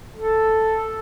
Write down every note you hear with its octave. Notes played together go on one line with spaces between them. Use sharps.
A4